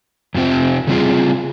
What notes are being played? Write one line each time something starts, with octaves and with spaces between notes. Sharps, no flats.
F2 C3 F3 C4
C#3 G3 C4 F4 G#4